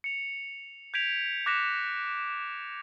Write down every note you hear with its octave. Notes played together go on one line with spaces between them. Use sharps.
C#7 F7
G6 G#6 B6 D7 F7
D6 F#6 A#6 B6 C#7 E7